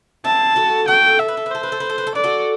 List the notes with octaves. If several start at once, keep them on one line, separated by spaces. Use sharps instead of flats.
C4 E4 A5
F#4 A4
F#4 A4 G5
A4 E5
B4
A4
B4
A4 C5
B4
A4
B4
A4
B4
A4
B4 D5
F#4 A4